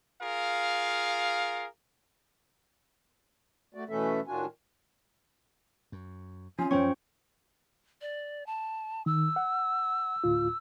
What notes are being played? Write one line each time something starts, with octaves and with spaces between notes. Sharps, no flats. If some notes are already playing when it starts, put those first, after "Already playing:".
F4 G#4 A#4 F5
A3 F#4 D5
B2 E3 A3 C#4 A4 E5
A2 D#3 D4 F4 F#4 G#5
F#2
F3 C4 C#4 F4 G#5
F#2 F3 C#4 C5 C#5 G5 C#6
D5
A5
D#3 E6
F#5
D2 A2 F4